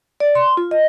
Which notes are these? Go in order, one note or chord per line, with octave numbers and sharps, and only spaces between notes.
D5
C6
F4
D#5